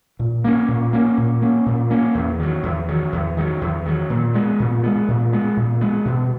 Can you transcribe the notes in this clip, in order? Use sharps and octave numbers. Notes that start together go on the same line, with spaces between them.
A#2
A#3 C#4
A#2
A#3 C#4
A#2
A#3 C#4
A#2
A#3 C#4
E2
D#3 F#3
E2
D#3 F#3
E2
D#3 F#3
E2
D#3 F#3
A#2
G#3 B3
A#2
G#3 B3
A#2
G#3 B3
A#2
G#3 B3
B2